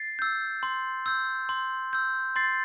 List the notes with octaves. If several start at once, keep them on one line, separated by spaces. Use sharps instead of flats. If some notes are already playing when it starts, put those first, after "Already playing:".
Already playing: A6 C7
E6 G6
C6
E6 G6
C6
E6 G6
C6 A6 C7